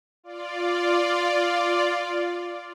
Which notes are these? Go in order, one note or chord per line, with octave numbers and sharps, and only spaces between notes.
F4 D5